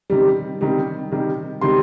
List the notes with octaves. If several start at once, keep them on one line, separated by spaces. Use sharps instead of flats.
C3 D#3 G3
C3 D#3 G3
C3 D#3 G3
C3 D#3 G3 C6